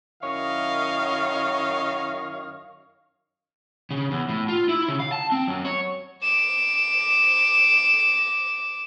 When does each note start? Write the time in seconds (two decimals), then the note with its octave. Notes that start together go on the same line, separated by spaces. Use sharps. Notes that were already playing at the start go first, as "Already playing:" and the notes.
0.22 F#2 D#3 E4 C#5 D#5 F5
3.91 C#3
4.11 E2
4.29 A2
4.49 F4
4.69 E4
4.88 C#3
5.00 F5
5.12 A5
5.32 C4
5.48 F#2
5.65 C#5
6.23 D6 E7